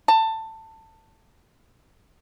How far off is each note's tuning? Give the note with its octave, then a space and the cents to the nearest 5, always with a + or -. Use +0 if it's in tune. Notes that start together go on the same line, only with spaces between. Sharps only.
A5 +15